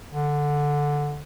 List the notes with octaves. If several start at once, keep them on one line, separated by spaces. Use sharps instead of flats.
D3